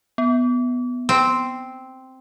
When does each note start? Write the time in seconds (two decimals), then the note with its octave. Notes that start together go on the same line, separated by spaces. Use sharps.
0.18 B3
1.09 C4